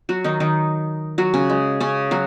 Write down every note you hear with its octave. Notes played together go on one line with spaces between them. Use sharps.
F#3 F#4
D#3 D#4
D#3 D#4
F#3 F#4
C#3 C#4
G#3
C#3 C#4
F#3 F#4